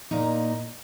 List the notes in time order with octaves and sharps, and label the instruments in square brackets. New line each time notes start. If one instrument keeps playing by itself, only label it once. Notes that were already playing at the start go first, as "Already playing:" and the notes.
[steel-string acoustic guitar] A#2 A#3 D#4